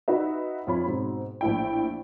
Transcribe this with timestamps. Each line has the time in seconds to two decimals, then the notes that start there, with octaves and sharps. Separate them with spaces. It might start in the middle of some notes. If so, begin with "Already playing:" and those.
0.08 D#4 F#4 B4 E5
0.67 F2 F4 C#5 B5
0.86 G#2 B2 C4
1.41 A#1 A2 E4 G5